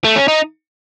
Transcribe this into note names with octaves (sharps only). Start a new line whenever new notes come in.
A3
C#4
D#4